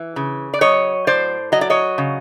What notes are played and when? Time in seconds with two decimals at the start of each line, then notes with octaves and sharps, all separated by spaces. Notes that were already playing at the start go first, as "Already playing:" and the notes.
Already playing: E3
0.16 C#3
0.54 D5
0.61 F#3 C#5 D#5
1.07 A2 C5 D5
1.52 F#3 D#5
1.61 D5
1.70 C#5 D#5
1.98 C#3